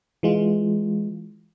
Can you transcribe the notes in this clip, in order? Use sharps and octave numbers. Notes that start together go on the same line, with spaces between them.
E3 G#3 F4